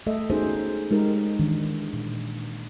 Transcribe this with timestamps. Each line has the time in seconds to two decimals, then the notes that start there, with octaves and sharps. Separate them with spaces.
0.07 A3 A4 D#5 E5
0.30 B3 C#4 D#4 F#4 G#4 C5
0.91 G#3 D#4 G4 A#4
1.39 D#3 E3 D4
1.93 A#2